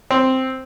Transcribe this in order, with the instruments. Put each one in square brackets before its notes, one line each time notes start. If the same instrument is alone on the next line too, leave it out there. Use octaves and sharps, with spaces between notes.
[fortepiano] C4